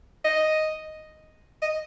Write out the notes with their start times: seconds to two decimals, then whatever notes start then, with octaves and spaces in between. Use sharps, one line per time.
0.25 D#5
1.62 D#5